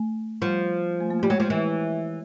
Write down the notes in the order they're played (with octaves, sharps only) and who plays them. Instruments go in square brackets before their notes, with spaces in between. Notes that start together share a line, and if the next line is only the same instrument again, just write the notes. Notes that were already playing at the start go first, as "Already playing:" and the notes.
Already playing: [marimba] A3
[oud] F3 [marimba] G3
[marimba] A3
A#3
[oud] G3 [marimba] A3
[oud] F#3 [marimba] G#3
[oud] F3
E3